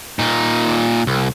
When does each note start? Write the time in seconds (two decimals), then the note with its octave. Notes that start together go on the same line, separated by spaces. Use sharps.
0.19 A#2 D#4
1.07 C2